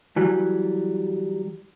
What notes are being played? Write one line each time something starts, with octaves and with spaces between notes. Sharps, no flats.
E3 F#3 G3